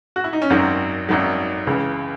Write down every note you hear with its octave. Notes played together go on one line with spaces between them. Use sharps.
F#4
E4
D#4
C#4
G#1 F#2 D#3 F#3 C4
G#1 F#2 D#3 F#3
C#2 C#3 E3